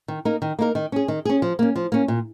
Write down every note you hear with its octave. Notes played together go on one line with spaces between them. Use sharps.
D#3
A#3 D#4 A#4
D#3
A#3 D#4 A#4
D#3
C#4 G#4
D#3
C#4 G#4
F3
A#3 C#4
F3
A#3 C#4
A#2